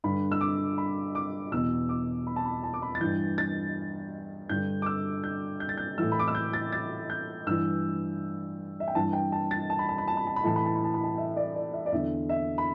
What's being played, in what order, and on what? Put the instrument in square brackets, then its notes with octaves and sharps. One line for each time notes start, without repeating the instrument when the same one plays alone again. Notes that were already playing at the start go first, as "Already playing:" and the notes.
[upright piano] G2 D3 B5
E6
D6
B5
D6
E2 B2 E6
D6
B5
A5
B5
A5
D6
B5
A6
G2 E3 G6
A6
G2 D3 G6
D6
E6
G6
G6
A6
G6
A2 E3 E6
B5
D6
E6
G6
A6
A6
G6
G2 E3 E6
E5
G5
G2 E3 A5
G5
A5
A6
A5
B5
A5
B5
A5
B5
A5
B5
A2 E3 A5
B5
A5
B5
A5
B5
A5
E5
D5
D5
E5
D5
E2 D3 E5
E5
B5